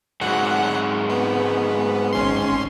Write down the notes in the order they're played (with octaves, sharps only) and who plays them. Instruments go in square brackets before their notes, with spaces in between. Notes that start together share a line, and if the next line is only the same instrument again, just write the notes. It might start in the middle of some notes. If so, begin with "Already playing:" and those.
[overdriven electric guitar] G#2 F#3 [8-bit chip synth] F#5
[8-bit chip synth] B3
G#1 C#4 C6